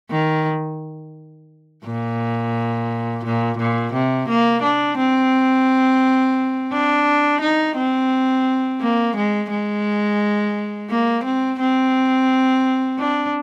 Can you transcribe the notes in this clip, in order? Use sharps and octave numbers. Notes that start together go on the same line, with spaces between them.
D#3
A#2
A#2
A#2
C3
A#3
D4
C4
D4
D#4
C4
A#3
G#3
G#3
A#3
C4
C4
D4